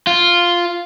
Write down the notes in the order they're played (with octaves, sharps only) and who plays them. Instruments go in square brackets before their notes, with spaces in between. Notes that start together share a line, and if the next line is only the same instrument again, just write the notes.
[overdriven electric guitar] F4